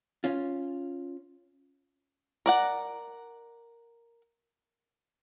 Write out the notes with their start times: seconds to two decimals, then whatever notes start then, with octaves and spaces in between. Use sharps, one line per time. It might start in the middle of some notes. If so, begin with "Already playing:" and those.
0.24 C#4 F4
2.46 A#4 D5 F#5